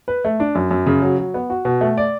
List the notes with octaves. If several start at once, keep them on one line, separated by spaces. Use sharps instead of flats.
B4
A3
D4
F#2
F#2
C#3
F#3
F#3
B3
F#4
B2
A3
D5